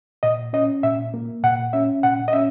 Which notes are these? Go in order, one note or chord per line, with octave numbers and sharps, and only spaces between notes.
A#2 D#5
C#4 D#5
A#2 E5
A#3
A#2 F#5
C#4 E5
A#2 F#5
D#5
C#4 E5